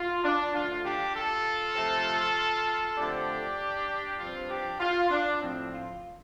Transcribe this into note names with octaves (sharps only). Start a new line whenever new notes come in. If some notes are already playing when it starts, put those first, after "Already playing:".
Already playing: F4
D4
D3 F3 A3 F4
D4 G4
F4 A4
C3 F3 A3 C4
D3 F3 A3 C4 D4 G4
G2 F3 C4 F4
D4 G4
F4
D4
A2 F3 C4
F4